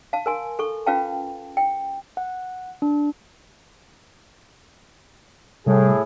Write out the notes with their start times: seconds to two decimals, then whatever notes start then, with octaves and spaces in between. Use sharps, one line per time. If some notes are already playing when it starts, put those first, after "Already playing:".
0.13 F5 A5
0.26 A#4 G#5 C6
0.59 A4 C#6
0.86 C#4 F4 B4 F5 G5 A5
1.57 G5
2.17 F#5
2.82 D4
5.67 A2 C3 G3 G#4